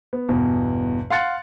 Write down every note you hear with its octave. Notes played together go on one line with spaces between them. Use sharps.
B3
G1 E2 B2
F5 F#5 C6 F#6 A6 C#7